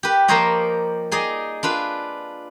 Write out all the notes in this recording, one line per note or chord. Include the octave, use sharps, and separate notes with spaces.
G4 B4
F3 A#3 A#4 C5 C#5 D#5
D#4 G#4 D5 D#5
D4 F4 B4